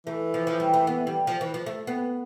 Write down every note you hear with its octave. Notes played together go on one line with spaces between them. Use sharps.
E3 A3
F3
F3
G3
A3
B3
G3
F3
E3
F3
A3
B3